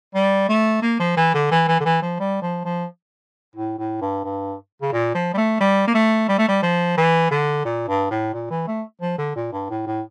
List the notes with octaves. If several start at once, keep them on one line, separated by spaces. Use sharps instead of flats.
G3
A3
A#3
F3
E3
D3
E3
E3
D3
E3
F3
G3
F3
F3
A2
A2
G2
G2
C#3
A#2
F3
G3
A3
G3
A#3
A3
G3
A3
G3
F3
E3
D3
A#2
G2
A2
A#2
E3
A3
F3
D3
A#2
G2
A2
A2